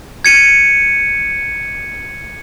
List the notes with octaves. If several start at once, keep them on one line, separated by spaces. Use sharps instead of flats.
G#6 C#7 D#7